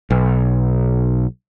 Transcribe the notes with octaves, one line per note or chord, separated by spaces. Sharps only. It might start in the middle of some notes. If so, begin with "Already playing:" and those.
B1